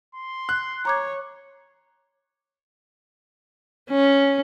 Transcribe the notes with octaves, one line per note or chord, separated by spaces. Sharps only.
C6
F#6
C#5 A#5 D6 G#6
C#4